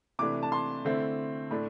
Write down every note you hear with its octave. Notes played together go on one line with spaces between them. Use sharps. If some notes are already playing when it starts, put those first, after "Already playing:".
C3 E3 A3 D4 D6
A5
C6
D3 A3 C4 E4
A2 A3 D4